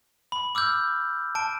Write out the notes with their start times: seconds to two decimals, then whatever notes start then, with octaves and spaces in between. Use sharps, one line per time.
0.32 B5
0.55 D6 E6 F6 G6
1.35 A5 D7